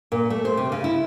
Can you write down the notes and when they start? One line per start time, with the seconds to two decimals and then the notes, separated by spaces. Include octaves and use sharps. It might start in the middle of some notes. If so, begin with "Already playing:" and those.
0.12 A#2
0.30 A3
0.45 C5
0.57 C3
0.72 C#3
0.84 E4